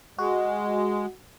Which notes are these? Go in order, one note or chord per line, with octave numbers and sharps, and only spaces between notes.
G#3 F#4